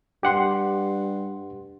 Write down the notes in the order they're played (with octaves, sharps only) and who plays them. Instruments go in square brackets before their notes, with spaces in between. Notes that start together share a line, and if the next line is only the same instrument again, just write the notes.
[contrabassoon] G2 [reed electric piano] G4 F#5 C6